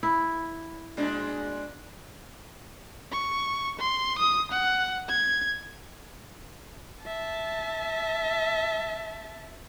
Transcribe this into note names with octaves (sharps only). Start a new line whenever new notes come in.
E4
A#2 G#3 D4
C#6
C6
D#6
F#5
G#6
E5 A5